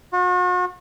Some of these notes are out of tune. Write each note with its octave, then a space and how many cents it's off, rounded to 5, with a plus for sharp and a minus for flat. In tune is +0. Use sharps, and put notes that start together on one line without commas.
F#4 -40